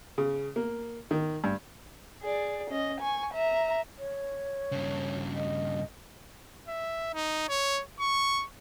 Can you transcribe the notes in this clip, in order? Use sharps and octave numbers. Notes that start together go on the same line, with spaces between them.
C#3
A#3
D#3
G2
G#4 D5
C#4 D#5
G#5 C#6
E5 A#5
C#5
G2 C#3
D#5
E5
D#4
C#5
C#6